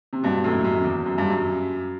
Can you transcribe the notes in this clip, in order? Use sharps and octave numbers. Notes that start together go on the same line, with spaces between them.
C3
G2 B2
F#2 A2
F#2
E2
F#2
G2
F#2